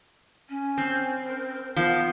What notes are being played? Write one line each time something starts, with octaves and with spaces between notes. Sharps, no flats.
C#4
C4
A#4
F3 B3